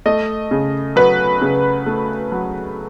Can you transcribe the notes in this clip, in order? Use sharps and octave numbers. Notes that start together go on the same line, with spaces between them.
A3 D#5
C#3
F#3 B4
C#3
A3
F#3